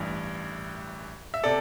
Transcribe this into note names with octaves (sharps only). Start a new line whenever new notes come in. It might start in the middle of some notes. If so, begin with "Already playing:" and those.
Already playing: A1 G2 E3
E5
C3 A4 D5